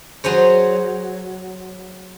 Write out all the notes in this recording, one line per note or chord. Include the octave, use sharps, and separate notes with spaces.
F#3 G#4 C5 C#5